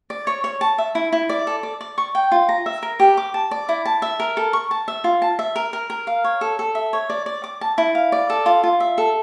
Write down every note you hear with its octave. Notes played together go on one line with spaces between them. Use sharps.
D5
C#5
C#5
A5
E5
E4
E4
D5
A4
D5
D5
C#6
G5
F4
A#5
E5
A#4
G4
D6
A5
D5
E4
A5
E5
A#4
A4
C#6
A5
E5
F4
A5
E5
A#4
A#4
A#4
F5
C#5
A4
A4
E5
C#5
D5
D5
D6
A5
E4
F5
D5
A4
F4
F4
E5
A4